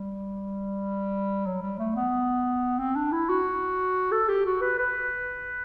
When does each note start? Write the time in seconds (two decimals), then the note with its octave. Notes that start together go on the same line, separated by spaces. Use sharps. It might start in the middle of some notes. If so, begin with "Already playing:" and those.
Already playing: G3
1.46 F#3
1.62 G3
1.79 A3
1.96 B3
2.79 C4
2.96 D4
3.12 E4
3.29 F#4
4.12 A4
4.29 G4
4.46 F#4
4.61 B4
4.78 B4